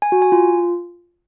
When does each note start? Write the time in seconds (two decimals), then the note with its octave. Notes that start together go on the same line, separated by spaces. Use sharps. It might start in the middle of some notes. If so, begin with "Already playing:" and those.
0.02 G#5
0.12 F#4
0.22 G#5
0.32 F4